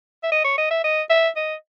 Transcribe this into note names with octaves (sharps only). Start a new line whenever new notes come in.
E5
D#5
C#5
D#5
E5
D#5
E5
D#5